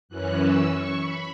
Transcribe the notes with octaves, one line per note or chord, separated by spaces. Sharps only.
F#2 E3 C#4 F#6
E6
C#6
B5